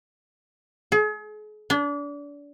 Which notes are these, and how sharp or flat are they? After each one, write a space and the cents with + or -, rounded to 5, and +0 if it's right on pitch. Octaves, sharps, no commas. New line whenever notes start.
G#4 +40
D4 -30